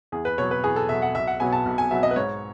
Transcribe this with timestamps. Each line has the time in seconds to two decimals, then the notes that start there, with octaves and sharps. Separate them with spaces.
0.12 E2 G#4
0.25 B4
0.38 B2 F#3 C#5
0.51 B4
0.64 E2 G#4
0.76 A4
0.89 B2 F#3 E5
1.02 F#5
1.15 B1 E5
1.27 F#5
1.40 B2 F#3 B3 G#5
1.52 A5
1.66 B1
1.78 G#5
1.91 B2 F#3 B3 E5
2.03 D#5
2.11 B4
2.16 G#2 C#5